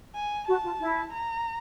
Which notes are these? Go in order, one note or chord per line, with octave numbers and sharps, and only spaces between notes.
G#5
F#4 A5
F4
E4
A#5